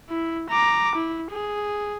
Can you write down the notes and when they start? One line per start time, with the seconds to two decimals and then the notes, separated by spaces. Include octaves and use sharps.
0.10 E4
0.50 A#5 D6
0.95 E4
1.31 G#4